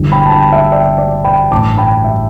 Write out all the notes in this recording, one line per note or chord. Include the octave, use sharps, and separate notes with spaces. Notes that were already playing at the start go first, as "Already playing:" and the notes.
Already playing: G1 G2 E3 G3
G5 B5
A5
G5 B5
E5
D5 G5
D5
G5 B5
A1 G2 E3 G3 A5 D6
G5 B5
E5